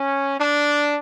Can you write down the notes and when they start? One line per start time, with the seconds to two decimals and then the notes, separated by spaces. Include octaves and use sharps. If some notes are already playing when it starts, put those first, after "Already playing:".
Already playing: C#4
0.40 D4